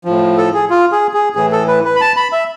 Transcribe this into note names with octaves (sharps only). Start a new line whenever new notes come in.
A2 F3
A4
G#4
F4
G#4
G#4
A2 E3 G#4
A4
B4
B4
B5
A5
B5
E5